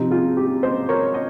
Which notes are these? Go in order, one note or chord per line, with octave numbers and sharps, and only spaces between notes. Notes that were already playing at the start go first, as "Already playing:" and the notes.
Already playing: C3 F3 C4 D#4
F4 G#4
G4
C5 D#5
A#4 C#5
D#5